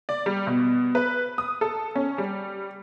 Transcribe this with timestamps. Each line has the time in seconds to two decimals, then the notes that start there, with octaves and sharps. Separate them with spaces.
0.09 D5
0.26 G3
0.47 B2
0.95 B4
1.38 D#6
1.61 A4
1.96 C#4
2.18 G3